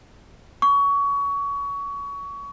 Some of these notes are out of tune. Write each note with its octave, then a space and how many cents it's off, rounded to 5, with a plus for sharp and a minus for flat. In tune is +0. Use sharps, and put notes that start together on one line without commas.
C#6 +25